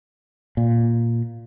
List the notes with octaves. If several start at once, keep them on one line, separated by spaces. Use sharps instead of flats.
A#2